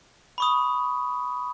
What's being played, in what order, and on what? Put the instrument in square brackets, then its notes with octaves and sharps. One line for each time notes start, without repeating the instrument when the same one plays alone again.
[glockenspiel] B5 C#6 D#6